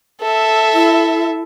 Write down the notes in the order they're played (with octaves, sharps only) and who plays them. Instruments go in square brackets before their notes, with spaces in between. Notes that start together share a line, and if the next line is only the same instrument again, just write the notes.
[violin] A4 E5
[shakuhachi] E4